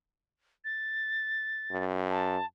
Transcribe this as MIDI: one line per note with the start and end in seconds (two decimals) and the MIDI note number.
0.65 1.83 93
1.72 2.37 42
2.10 2.45 81